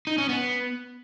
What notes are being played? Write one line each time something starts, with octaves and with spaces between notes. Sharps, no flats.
D#4
C#4
B3